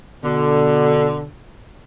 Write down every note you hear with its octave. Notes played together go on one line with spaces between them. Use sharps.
B2 D3